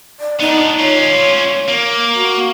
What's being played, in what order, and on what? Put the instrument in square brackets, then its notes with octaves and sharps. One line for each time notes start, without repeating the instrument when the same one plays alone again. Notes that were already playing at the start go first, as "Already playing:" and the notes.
[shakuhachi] D5
[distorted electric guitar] B3 D4 [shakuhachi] D#4
[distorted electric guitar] C#4 F4 [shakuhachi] C#5
[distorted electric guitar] A#3
[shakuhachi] F#4